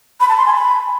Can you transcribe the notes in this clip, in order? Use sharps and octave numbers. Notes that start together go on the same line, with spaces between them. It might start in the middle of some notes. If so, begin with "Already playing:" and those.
B5
A5
C6
G#5
B5